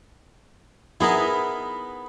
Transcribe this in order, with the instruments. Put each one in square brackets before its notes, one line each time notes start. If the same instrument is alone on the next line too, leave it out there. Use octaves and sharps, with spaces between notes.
[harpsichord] B3 D#4 [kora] E4 G#4 A#4